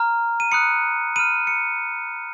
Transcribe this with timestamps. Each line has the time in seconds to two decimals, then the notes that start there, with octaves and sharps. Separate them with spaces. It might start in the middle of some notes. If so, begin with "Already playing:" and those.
Already playing: A#5 F6
0.40 D#7
0.52 B5 D#6 F#6 C#7
1.16 B5 F6 D#7
1.47 C#7